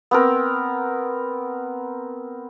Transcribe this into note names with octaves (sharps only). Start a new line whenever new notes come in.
B3 C4 A#4